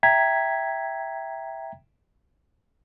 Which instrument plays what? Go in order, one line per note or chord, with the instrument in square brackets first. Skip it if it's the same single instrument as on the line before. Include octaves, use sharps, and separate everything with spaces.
[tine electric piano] E5 G5 A#5 G#6 B6